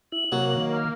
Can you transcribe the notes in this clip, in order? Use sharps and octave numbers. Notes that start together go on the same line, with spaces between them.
E4 F#7
C3 F#3 A#3 F#5
D#3
F6